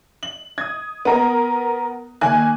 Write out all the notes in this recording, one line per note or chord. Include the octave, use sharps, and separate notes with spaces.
F#7
D#6 G#6
B3 A#4
D#3 A#3 G#5 F#6